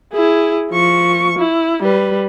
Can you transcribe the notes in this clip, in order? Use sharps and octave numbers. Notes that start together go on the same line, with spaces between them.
E4 G#4
F3 C#6
E4
G3 B4